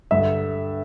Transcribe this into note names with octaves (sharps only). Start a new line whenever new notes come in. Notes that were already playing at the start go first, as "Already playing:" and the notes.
G2 D3 E5